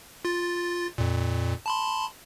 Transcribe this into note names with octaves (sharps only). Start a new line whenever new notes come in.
F4 A6
F2 A#2
A5 B5 C6